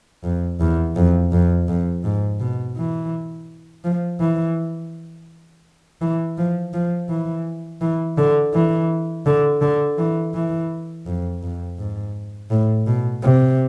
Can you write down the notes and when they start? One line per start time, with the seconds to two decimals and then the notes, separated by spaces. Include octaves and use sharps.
0.24 F2
0.60 E2
0.95 F2
1.32 F2
1.68 F2
2.04 G#2
2.40 B2
2.76 E3
3.84 F3
4.20 E3
6.01 E3
6.37 F3
6.73 F3
7.09 E3
7.81 E3
8.17 D3
8.54 E3
9.26 D3
9.61 D3
9.98 E3
10.34 E3
11.06 F2
11.42 F2
11.78 G#2
12.50 A2
12.87 B2
13.22 C3